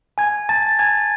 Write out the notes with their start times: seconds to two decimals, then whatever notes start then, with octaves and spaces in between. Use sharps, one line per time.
0.18 G#5 G#6
0.49 A5 A6
0.79 G#5 G#6